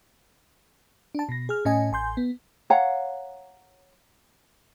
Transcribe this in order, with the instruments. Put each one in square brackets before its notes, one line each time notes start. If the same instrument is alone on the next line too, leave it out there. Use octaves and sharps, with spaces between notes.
[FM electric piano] D4 A5
B2 A#6
G#4 F6
A2 C#4 D#5 G#5
A1 G#5 C6 G6
B3
[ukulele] C#5 F5 F#5 A#5